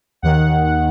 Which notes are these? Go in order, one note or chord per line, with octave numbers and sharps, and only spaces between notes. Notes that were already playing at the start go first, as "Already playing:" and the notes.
D#2 D#3 F#5